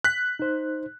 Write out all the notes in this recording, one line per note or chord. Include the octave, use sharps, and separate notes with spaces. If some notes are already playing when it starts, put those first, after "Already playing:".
F#6 B6
D#4 C5